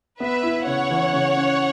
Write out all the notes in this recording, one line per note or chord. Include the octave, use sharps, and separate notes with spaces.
B3 B4 E5
E4
C#3 C#5 F#5
E3
C#3
C#4